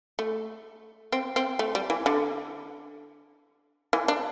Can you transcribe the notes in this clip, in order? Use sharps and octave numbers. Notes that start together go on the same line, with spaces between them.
A3
C4
C4
A3
G3
E3
D3
E3
D4